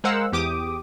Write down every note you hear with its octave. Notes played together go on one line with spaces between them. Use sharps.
G#3 A#4 C5 F5 F#5 E6
E2 G4 D6 D#6